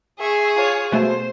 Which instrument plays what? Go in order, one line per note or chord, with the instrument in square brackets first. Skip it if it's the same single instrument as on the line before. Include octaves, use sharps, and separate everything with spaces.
[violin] G#4 [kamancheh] E5 C#6
[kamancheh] F4 C#5
[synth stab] B2 A3 [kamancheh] C5